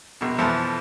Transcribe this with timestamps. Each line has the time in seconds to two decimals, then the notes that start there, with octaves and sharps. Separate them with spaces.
0.21 A#1 B2
0.38 F2 B2 E3 F3 A4 E5